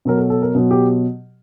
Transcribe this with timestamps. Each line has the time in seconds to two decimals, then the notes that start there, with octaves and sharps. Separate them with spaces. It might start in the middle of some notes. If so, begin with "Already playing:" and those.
0.05 B2 F#3 A#4
0.17 A4
0.30 A4
0.42 A#4
0.55 B2 F#3
0.71 G4